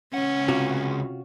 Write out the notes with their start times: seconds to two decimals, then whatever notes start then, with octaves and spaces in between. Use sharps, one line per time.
0.14 C#2 C#4 F#5
0.48 C3 F4 F#4